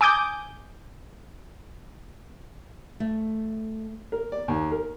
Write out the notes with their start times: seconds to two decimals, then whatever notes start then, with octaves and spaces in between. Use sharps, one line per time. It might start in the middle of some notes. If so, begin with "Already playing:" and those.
0.01 G#5 D6 D#6 G6
3.00 A3
4.12 A#4
4.32 D5
4.48 D#2
4.71 A#4